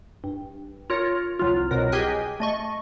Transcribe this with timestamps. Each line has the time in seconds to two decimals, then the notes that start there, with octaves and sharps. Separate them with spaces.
0.24 G2
0.90 F4 A#4 C#5
1.39 C2 F#3 F4
1.71 C2 B2 F#3 A#4
1.92 G4 G#4 D#5 G5 G#5 F#6
2.40 A3 D#5 C#6